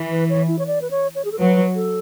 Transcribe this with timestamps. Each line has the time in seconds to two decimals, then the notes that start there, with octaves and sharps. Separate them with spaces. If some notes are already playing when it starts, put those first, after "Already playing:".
Already playing: E3
0.12 B4
0.29 C#5
0.48 E4
0.59 C#5
0.67 D5
0.81 B4
0.91 C#5
1.15 C#5
1.25 G#4
1.32 A4
1.39 F#3 B4
1.75 A4